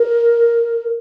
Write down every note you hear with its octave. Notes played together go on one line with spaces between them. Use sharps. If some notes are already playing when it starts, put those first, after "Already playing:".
Already playing: A#4